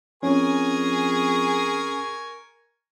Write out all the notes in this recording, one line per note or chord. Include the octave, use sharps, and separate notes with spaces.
F2 C#4 G#4 A#4 G#5 C#6